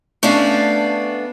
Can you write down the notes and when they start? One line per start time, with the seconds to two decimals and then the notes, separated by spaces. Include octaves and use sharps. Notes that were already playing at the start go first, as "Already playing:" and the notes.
0.23 A3 B3 C#4 D4 D5 F5